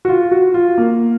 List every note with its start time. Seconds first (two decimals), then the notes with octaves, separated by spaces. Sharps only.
0.05 F#4
0.09 F4
0.31 F#4
0.54 F4
0.78 A#3